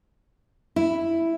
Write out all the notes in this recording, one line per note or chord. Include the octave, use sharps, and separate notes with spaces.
E4